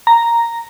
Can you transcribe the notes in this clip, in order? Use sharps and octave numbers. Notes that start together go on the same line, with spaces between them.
A#5